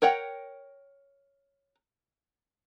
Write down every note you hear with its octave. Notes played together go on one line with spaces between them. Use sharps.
A#4 C#5 F#5 G5